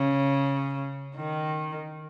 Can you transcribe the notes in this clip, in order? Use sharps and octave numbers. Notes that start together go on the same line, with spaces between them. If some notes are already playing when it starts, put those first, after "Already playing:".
Already playing: C#3
D#3